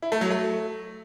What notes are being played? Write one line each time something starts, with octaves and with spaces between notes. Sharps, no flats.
E4
A3
F#3
A3